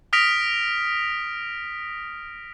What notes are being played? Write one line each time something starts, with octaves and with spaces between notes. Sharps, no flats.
D#6 F6 A#6 B6 D7 F7